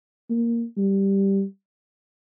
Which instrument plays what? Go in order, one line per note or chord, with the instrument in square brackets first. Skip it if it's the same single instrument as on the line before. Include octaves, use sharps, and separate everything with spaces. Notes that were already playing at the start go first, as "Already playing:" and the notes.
[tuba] A#3
G3